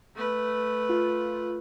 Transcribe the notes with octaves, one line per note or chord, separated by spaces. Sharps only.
A3 B4
F4